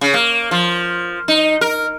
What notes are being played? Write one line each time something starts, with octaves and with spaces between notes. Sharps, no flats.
C#3
A#3
F3
D#4
A#4